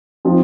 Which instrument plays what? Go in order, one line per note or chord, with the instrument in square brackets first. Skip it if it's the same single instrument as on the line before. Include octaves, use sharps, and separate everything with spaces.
[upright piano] F3 C4 D#4